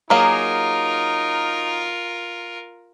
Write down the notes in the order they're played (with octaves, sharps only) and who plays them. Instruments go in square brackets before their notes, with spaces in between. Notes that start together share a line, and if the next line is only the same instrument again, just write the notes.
[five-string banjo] F#3 A#3 G#4 [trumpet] D#4 [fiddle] F4 A#4 [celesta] A#5